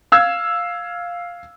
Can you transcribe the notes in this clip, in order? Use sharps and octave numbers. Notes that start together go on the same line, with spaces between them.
F5 E6 G#6